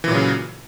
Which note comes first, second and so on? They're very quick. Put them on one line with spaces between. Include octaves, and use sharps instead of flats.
E3 A#2 F#3 C#3